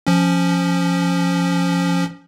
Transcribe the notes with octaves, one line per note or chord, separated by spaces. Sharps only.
F3 C#4